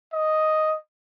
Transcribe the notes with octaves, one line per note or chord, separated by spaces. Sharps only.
D#5